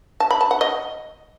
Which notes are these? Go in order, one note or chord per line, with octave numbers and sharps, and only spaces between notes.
A5
B5
A5
F#5
D#5